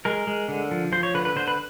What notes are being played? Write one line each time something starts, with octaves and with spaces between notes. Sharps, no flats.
G#3 A#4
G#3
D3
F3
F3 C5
C#5
D3 B4
B4
D3 C5
B4